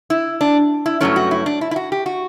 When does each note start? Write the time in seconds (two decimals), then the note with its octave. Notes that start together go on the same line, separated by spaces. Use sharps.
0.10 E4
0.41 D4
0.86 E4
1.01 G2 F#3 A3 C#4 E4
1.16 F#4
1.31 E4
1.46 D4
1.61 E4
1.71 E4
1.76 F#4
1.92 G4
2.06 F#4